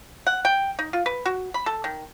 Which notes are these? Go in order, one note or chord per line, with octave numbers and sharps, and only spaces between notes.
F#5
G5
D#4
F4
B4
F#4
B5
A4
D#3